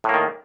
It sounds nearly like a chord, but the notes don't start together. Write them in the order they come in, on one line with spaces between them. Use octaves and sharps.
A2 A#3 D#3